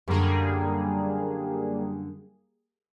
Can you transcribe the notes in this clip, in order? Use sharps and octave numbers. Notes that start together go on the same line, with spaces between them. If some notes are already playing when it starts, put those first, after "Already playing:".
F#2 D3 G3 A#3 G#4